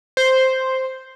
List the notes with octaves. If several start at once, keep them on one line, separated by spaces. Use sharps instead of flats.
C5